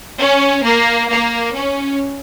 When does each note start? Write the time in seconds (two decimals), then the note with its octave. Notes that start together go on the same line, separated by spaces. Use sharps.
0.20 C#4
0.65 A#3
1.10 A#3
1.55 C#4